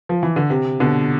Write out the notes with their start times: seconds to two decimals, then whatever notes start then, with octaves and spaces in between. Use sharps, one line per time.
0.09 F3
0.23 E3
0.36 D3
0.50 C3
0.80 B2 D3